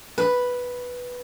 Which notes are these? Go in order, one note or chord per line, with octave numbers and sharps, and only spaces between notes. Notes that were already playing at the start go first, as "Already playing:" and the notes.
B4